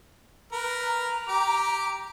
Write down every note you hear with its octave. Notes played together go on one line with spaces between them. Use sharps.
A#4 B4
A#5
G4 D6